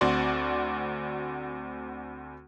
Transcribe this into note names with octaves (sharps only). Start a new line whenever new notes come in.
D2 C4 F#4 D5 C6